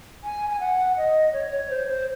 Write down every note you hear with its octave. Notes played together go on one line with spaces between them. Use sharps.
G#5
G#5
F#5
D#5
C#5
C#5
C5
C5